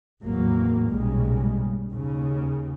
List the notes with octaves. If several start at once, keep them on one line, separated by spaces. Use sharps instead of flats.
G#1 E2 A2 E3 F#3 A#3
B1 G2 A#2 C#3 G3 G#3
D#2 C#3